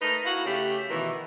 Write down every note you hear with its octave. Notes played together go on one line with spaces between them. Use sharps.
A3 D#4 A#4 B4
E4 F#4 F5
C#3 A3 G4
B2 D#3 E3